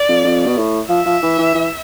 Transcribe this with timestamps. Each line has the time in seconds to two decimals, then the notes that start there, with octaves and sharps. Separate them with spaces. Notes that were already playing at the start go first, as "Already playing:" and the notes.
Already playing: D5
0.09 F2
0.24 F2
0.47 B2
0.57 A2
0.89 F3 E5
1.06 F3
1.22 E3
1.38 E3
1.55 E3